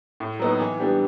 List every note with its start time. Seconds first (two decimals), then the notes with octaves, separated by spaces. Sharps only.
0.20 A2
0.39 F#3 B3 D#4
0.60 E3
0.80 G3 B3 D4 G4